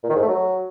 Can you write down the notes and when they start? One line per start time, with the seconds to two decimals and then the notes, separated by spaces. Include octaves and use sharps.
0.03 A#2
0.10 D#3
0.16 G#2
0.22 A3
0.28 F#3